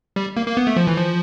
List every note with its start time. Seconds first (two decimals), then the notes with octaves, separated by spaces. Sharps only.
0.16 G3
0.37 A#3
0.47 A#3
0.57 B3
0.67 A3
0.77 F3
0.87 E3
0.97 F3